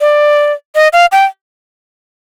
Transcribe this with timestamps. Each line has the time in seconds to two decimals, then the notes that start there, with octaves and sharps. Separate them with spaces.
0.01 D5
0.75 D#5
0.93 F5
1.12 G5